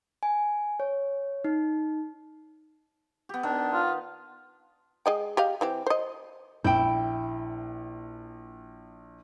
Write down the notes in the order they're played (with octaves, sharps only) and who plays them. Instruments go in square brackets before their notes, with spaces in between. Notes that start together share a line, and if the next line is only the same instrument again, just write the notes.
[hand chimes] G#5
C#5
D#4
[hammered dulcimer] B3 G4
[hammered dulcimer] D#3 B3 [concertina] D4
[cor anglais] F4
[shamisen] G#3 D#5 G5
G4 D#5 F5
E3 C4 G4
C5 D#5
[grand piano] A#1 [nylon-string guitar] E4 [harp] G5 G6